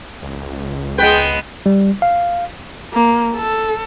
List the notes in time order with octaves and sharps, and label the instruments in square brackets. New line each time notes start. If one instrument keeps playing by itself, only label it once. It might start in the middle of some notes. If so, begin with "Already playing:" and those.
[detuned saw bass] C#2
[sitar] G#3 B3 B4 [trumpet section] G5
[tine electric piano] G3
F5
[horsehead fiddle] A#3
A4